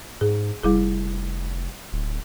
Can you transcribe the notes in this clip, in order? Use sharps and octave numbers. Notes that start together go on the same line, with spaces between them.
G#2 G#4
F1 G3 E4 G#4
D1